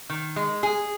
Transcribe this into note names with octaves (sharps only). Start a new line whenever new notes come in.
D#3
G#3
G#4